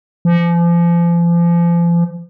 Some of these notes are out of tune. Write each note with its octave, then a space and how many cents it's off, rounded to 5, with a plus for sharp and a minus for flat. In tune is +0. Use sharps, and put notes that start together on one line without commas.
F3 -35